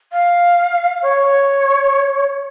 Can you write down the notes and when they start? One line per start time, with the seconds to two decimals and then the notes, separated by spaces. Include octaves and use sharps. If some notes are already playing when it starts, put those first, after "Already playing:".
0.12 F5
1.02 C#5